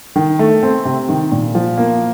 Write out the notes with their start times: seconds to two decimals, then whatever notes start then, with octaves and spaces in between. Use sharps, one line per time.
0.16 D#3
0.39 A3
0.63 C4
0.85 C3
1.09 D#3
1.32 A#2
1.55 F3
1.78 A#3